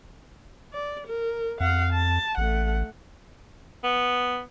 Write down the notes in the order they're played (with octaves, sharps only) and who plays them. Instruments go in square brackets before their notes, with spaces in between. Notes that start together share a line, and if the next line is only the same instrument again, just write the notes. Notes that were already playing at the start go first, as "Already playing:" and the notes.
[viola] D5
A#4
[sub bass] F2 [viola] F5 F#5
[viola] A5
[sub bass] A1 [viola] A3 F#5
[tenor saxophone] B3